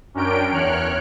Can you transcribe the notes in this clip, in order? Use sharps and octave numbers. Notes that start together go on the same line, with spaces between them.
F#2 C#4 D4 A#4 G5 D7
E2 C#5 F6 F#6